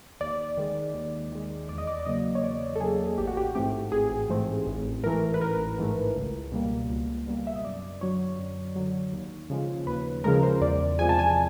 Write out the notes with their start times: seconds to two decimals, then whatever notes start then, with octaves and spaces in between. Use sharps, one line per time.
0.20 D#2 D5
0.57 D#3 G#3
0.94 D#2
1.32 D#3 G#3
1.69 E2 D5
1.78 D#5
1.87 D5
1.99 D5
2.06 C#3 F#3 A#3 D#5
2.35 C#5
2.43 E2 D5
2.76 A4
2.80 C#3 F#3 A#3 G#4
3.18 A1 G4
3.27 F#4
3.37 G4
3.55 G#2 E3 A3 C4 G4
3.92 A1 G#4
4.29 G#2 E3 A3 C4
4.67 A1
5.03 G#2 E3 A3 A#4
5.34 B4
5.41 A1 A#4
5.78 G#2 E3 A3
6.16 C#2
6.52 B2 G3 A#3
6.90 C#2
7.27 B2 G3 A#3
7.47 E5
7.56 D#5
7.64 F#2 D5
8.01 D3 F#3 C#5
8.39 F#2
8.76 D3 F#3
9.13 D#2
9.50 C#3 F3 G#3
9.87 D#2 B4
10.24 C#3 F3 G#3 A#4
10.43 C5
10.61 E2 D5
10.99 C3 F3 G#3 G#5
11.09 A5
11.19 G#5